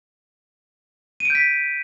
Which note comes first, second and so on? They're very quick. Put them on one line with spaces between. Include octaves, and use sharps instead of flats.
D#7 D7 G6 B6